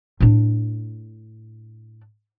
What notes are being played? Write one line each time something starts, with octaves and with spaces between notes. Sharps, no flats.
A2 D4